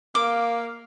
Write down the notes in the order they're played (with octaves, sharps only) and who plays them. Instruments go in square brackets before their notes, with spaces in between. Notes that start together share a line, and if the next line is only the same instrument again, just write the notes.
[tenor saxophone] A#3 [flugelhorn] F5 [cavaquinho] D6